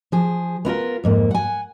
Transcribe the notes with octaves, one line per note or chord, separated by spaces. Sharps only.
F3 G#4
B3 E4 F4 A#4
F2 G#2 A#3
F#5 G#5